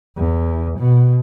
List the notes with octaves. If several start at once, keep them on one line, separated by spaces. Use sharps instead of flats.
E2
B2